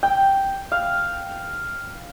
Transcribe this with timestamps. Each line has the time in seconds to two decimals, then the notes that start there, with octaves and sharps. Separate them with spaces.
0.03 G5
0.72 F5